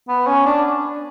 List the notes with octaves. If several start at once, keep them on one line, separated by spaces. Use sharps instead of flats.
B3
C#4
D4